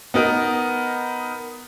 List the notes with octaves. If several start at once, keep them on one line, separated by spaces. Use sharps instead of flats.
B3 D#4 A#4